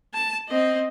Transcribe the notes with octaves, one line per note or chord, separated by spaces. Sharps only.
A5
C4 D#5